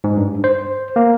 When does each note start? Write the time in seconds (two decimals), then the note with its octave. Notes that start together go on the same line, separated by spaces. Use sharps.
0.04 G#2
0.17 G2
0.44 C5
0.96 A#3